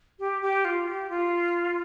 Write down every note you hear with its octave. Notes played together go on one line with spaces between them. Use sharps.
G4
G4
F4
G4
F4